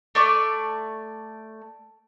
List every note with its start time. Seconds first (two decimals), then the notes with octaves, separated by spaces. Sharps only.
0.15 A3 D5 C#6